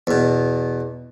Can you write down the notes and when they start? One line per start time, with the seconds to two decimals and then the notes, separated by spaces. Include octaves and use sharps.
0.07 E2 B2